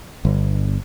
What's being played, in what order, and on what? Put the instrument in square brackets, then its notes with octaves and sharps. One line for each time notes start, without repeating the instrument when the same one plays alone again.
[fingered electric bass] G1